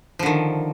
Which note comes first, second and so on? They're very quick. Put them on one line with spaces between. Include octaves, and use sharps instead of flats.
F3 D3 D#3